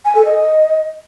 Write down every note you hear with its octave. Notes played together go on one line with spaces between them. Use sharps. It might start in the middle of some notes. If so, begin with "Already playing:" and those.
G#5
A4
D#5